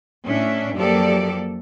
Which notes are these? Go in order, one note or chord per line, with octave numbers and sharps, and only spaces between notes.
A2 C#4 D4 E5
F#2 F3 A#3 G4 A4 D5